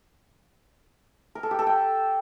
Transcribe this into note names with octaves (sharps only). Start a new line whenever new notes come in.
A#4
A4
G4
A4
G5